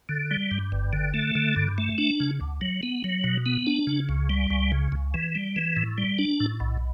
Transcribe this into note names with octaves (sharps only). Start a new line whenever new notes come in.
D3
G3
G2
G1
D3
A3
D3
G2
A3
D4
C#3
D2
F#3
B3
F#3
B2
B3
D4
C#3
C#2
G3
C#2
C#3
C#2
E3
G3
E3
A2
G3
D4
A2
B1